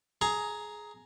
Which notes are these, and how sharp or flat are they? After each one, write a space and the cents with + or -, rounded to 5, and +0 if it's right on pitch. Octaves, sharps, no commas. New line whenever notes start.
G#4 +15 A#5 +0